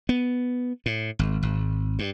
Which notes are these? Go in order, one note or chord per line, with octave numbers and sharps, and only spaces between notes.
B3
A2
G#1
G#1
G2